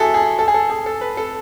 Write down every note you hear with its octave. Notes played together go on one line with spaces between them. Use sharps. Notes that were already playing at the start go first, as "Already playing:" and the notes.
Already playing: E4 F#4 G#4 A4
G#4
A4
G#4
A4
G#4
A4
B4
A4